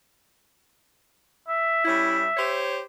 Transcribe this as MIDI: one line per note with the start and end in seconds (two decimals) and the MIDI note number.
1.48 2.64 76
1.85 2.23 55
1.85 2.23 61
1.85 2.23 64
2.37 2.80 67
2.37 2.80 72
2.37 2.80 73